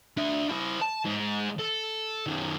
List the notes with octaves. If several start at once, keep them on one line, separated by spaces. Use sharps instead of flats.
D4 E5
E4 C5
A5
G#2
A4
F#2 D#3